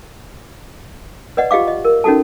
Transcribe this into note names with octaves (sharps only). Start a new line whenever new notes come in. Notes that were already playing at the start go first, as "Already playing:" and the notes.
B4 D5 D#5 F#5
F4 G4 D#5 F5 D6
D#5
A#4
C#4 D#4 F#4 A4 A5